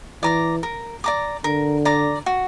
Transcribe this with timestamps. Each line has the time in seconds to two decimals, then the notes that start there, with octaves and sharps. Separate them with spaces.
0.23 E3 D5 A#5 D6
0.63 A#4
1.04 D5 A#5 D6
1.44 D3 A#4
1.85 D5 A#5 D6
2.26 F#4